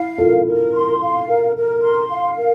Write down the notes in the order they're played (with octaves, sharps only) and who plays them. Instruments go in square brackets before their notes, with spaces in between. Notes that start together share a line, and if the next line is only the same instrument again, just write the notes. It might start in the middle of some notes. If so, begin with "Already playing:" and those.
Already playing: [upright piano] E4 [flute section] F5
[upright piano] F4 A4 [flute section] A#4
[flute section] A#4
C6
F5
A#4
A#4
C6
F5
A#4